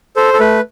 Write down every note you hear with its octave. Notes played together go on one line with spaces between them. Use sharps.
A4 C5
A4
A3 B4